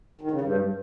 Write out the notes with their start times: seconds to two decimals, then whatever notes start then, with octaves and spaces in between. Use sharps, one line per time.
0.21 D#3
0.31 C#3
0.41 G2